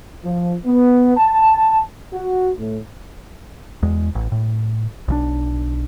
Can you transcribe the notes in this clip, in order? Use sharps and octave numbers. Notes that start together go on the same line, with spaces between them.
F3
B3
A5
F#4
A2
E2 G#3
A1
A2
B1 E3 D4